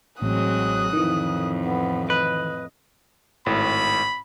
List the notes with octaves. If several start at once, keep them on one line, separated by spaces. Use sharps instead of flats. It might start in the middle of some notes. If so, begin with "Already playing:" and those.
A1 F#3 G#3 C4 D#6 F#6
F2 A2 D#3 E3
B3
B4 D#5
G#1 A2 B5